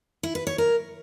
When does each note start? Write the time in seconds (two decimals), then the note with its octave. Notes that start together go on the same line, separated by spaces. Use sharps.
0.23 E4
0.35 B4
0.47 C#5
0.58 A#4